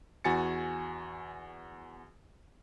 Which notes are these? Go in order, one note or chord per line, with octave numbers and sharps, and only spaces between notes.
E2 F#4 G#5 A6 C#7